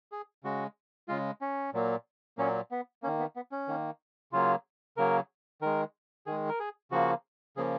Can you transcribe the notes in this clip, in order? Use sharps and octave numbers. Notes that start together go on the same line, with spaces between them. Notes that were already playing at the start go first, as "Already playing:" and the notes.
G#4
C#3 G#3 F#4
C#3 G#3 F4
C#4
A#2 F#3 A#3
A#2 F#3 A#3 C#4
B3
D#3 A#3 C#4
B3
B3
C#4
D#3 A#3
C#3 F#3 A#3 F4
C#3 F#3 A#3 A#4
D#3 G#3 A#4
D#3 G#3 G#4
A#4
G#4
C#3 F3 A#3 F#4
C#3 F3 A#3 G#4